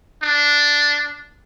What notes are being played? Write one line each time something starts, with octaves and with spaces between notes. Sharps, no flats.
D4